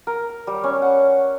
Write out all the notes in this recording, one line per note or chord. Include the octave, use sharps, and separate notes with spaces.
A#4
G3
C#4
F#5